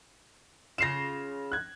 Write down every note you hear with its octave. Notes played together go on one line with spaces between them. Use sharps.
C#3 F4 A#6 C7 E7
F#6 G#6